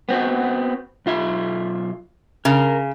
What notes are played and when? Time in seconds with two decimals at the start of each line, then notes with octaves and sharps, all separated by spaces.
0.09 B3 C4 F#4
1.06 B1 F4 E5
2.45 C#3 A#4